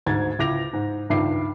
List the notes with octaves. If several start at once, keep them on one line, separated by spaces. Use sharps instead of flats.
D2 G#2 G#6 A6
C#2 E4 D6 G6 A#6 F7
G#2
C#2 G2 D#3 E5 D6 C7